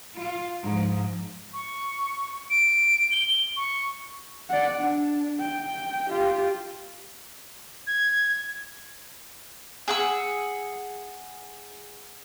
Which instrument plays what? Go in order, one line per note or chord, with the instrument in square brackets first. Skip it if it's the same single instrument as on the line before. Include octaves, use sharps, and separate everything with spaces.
[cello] F4
G#2 F3
[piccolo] C#6
D7
G7
C#6
[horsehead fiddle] D5 F#5
D4
G5
F4 G4
[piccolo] G#6
[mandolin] G#4 F#5 E6